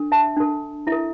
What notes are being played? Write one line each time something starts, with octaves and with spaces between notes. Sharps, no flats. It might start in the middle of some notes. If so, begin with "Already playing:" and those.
Already playing: D4 A4
E5 A5
D4 A4
E4 E5
A4